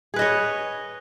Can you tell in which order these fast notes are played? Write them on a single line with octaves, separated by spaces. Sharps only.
G#4 B4 D#5 C#5